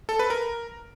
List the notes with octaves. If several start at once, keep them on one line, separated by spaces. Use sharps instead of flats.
A4
B4
A#4